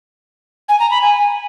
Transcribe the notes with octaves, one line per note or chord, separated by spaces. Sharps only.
G#5
A#5
B5
G#5